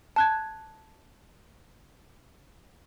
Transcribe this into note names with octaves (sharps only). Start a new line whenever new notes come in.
A5 F#6 G#6